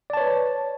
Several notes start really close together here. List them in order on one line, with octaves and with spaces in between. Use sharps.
D5 A5 C#5 B4